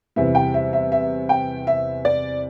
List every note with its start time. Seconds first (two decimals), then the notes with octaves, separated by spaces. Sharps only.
0.16 E2 C3 E3 G3 E5
0.35 G5
0.54 E5
0.73 E5
0.92 E5
1.29 G5
1.67 E5
2.05 D5